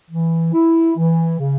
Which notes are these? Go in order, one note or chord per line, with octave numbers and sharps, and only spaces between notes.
E3
E4
E3
C#3